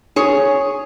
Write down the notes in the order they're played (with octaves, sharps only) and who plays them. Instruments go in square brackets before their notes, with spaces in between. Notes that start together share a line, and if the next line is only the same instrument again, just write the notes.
[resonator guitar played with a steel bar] G#4 C#5